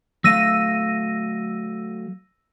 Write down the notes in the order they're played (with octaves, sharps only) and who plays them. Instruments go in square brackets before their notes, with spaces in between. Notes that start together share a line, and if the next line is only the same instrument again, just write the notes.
[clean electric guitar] F#3 A3 F5 [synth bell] E6 A#6 D#7